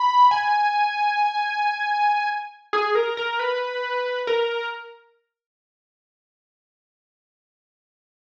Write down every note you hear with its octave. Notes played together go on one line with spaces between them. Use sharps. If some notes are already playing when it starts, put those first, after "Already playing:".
Already playing: B5
G#5
G#4
A#4
A#4
B4
A#4